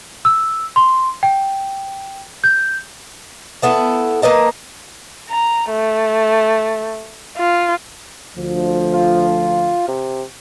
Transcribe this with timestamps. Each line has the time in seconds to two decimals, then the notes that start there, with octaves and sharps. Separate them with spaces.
0.25 E6
0.76 C6
1.23 G5
2.44 G6
3.62 A3 B3 E4 A4
4.22 A#3 B4 D#5 A5
5.30 A#5
5.70 A3
7.38 F4
8.37 D2 F3
8.94 F4
9.88 C3